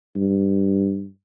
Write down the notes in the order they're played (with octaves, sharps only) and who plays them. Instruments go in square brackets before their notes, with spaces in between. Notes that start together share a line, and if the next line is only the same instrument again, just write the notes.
[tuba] G2